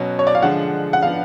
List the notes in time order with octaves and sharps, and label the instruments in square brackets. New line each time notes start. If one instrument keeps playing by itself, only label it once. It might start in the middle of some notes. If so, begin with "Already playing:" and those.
Already playing: [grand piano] B2 F#3 C#4
[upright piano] C#5
D5
F5
[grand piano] D3 F3 G#3 D4 [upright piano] F#5
[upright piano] F#5
[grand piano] F3 B3 D4 [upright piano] F5